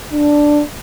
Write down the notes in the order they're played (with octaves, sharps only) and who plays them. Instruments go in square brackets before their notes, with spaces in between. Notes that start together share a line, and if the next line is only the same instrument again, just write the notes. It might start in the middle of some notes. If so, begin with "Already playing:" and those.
[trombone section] D4